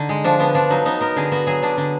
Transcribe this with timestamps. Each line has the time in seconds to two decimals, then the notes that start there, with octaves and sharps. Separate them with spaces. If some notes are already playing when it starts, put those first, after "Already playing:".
Already playing: D3 D#4
0.09 G#3
0.24 F3 D4
0.40 D3 B3
0.54 F3 D4
0.70 F#3 D#4
0.85 B3 D#4
1.01 B3 A#4
1.16 D3 G#4
1.32 B3 F#4
1.47 F#3 G#4
1.63 D3 D4
1.77 D3